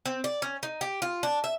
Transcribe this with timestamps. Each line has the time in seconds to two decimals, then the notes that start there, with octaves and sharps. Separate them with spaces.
0.06 C4
0.24 D5
0.42 C#4
0.63 D#4
0.81 G4
1.02 F4
1.23 D4
1.44 E5